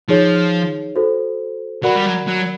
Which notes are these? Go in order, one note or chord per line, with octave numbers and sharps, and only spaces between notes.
F3 D#4 G#4 C#5
F#4 A4 C5
F#3 F#4 A#4 D5 F#5 B5
G3
F#3
F#3